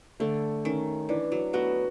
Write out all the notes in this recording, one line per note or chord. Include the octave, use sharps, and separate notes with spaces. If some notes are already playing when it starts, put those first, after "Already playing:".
D3 A3
D#3 C#4
E3 D4
F#3
A3 B3 F#4